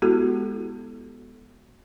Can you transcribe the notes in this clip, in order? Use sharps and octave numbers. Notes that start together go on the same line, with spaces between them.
G#3 B3 E4 F#4 G4 A4